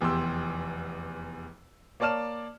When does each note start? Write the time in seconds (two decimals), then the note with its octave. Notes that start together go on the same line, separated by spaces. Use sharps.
0.01 F1 E2 G4 G5 C6 E6
2.00 A#3 C#5 D5 A5 F6 E7